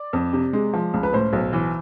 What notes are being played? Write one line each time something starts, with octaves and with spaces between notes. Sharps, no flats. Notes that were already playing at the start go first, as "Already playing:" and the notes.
Already playing: D5
F2
C3
G#3
F3
C#2
B4
A2 C5
B1
E3